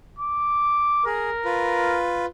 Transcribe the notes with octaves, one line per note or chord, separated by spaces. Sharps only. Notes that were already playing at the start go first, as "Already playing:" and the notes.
D6
G#4 A#4
F4 B4